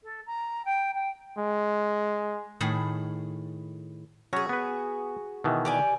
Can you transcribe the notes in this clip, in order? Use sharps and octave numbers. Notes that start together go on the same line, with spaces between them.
A4
A#5
G5
G5
G#3
A2 D#3 G#4 A5 B5
F#3 C#4 F#4 G#4 C#5
B3 B4
B2 D#3 E3
G4 D5 G#5